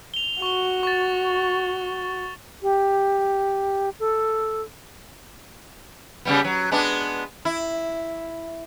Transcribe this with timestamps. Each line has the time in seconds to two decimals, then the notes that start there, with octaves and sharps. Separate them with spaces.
0.14 F7 G7
0.42 F#4 C#6 G7
0.83 C#6 A6
2.63 G4
4.00 A4
6.25 C#3 G3 B3
6.44 F#3
6.72 G#3 B3 D4
7.45 E4